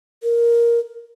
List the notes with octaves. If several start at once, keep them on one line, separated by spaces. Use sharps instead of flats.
A#4